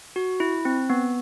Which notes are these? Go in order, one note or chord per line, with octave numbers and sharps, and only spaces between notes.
F#4
E4
C4
B3